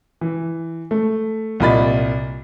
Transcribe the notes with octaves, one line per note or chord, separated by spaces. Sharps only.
E3
A3
C2 A#2 D#5 B5 A6